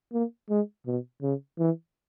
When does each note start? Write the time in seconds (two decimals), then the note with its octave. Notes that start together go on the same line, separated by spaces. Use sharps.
0.13 A#3
0.50 G#3
0.87 B2
1.22 C#3
1.59 E3